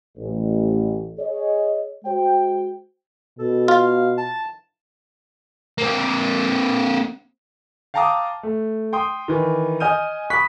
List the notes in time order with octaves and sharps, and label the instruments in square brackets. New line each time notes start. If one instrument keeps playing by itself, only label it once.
[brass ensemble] A1
G#4 C#5 D#5
G#3 F#4 C5 G5
[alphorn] B2 [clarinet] A4
[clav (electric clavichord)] F4 [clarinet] F5
[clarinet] A5
[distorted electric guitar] A#3 C4
[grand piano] F5 G5 A5 A#5 D6 D#6
A3
G5 C6 D#6
D#3 E3
D#5 G#5 D#6 F6 G6 D#7
B5 C#6 D#6 F#6 B6